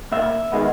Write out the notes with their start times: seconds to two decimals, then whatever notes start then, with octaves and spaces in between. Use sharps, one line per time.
0.12 A#2 A#3 E5
0.52 D#3 G#3 B3